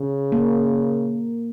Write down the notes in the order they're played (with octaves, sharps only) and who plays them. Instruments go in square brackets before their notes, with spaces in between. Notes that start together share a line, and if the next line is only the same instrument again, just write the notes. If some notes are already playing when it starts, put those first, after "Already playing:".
Already playing: [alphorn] C#3
[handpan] A#3